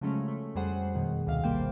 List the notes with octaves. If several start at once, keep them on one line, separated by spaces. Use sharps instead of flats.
C#3 F3 F#3 G#3 A3 C#4
A3
F2 F#3 G3 G#4 C5 F#5
F#2 B2 D#3
D2 C3 D#3 F5
G#1 G3 A#3 C5 G5